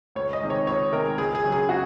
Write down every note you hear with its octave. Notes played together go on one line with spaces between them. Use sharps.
C#2 C#5
D#5
C3 D#3 G#3
C#5
C#2 C#5
C3 D#3 G#3 A#4
C#2 G#4
G#4
C#3 F#3 C#4
G#4
F#4